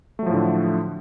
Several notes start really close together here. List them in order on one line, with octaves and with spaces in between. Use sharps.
A3 F#3 F3 A2 D3